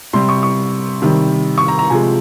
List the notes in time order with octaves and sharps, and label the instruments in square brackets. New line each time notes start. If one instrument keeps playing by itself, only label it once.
[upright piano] C3 G3 C6
C#6
C#6
C3 D#3 G3
C#6
A#5
A#5
C3 F3 G#3 G#5